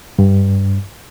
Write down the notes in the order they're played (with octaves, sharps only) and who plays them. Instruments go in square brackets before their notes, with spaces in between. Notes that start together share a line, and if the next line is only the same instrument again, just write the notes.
[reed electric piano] G2